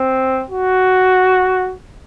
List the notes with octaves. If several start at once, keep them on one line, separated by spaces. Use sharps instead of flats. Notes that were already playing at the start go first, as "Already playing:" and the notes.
Already playing: C4
F#4